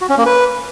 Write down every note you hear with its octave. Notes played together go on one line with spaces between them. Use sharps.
F#4
C#4
A#3
B4